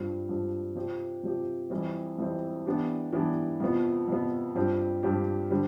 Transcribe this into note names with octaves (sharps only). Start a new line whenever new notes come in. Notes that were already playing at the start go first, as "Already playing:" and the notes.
Already playing: G2 F3 C4
G2 F3 C4
C3 F3 C4 G4
C3 F3 C4 G4
F2 E3 G3 C4
F2 E3 G3 C4
E3 B3 D4 G4
E3 B3 D4 G4
F2 C3 F3 B3
F2 C3 F3 B3
G2 F3 C4 G4
G2 F3 C4 G4
D3 G3 C4